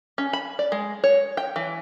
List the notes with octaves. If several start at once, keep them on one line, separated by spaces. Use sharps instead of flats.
C#4
B5
D5
G#3
C#5
G5
E3